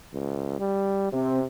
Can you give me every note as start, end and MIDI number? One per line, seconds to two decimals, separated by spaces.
0.14 0.57 37
0.59 1.09 55
1.12 1.46 48
1.12 1.39 60